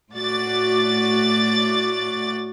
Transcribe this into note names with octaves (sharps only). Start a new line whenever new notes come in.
A2 F#4 D5 A6